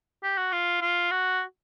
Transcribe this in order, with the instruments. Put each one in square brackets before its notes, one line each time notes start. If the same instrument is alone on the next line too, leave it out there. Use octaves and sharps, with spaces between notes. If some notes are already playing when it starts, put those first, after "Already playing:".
[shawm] G4
F#4
F4
F4
F#4